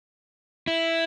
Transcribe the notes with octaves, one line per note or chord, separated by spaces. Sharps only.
E4